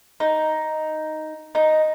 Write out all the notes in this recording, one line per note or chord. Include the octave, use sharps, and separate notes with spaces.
D#4
D#4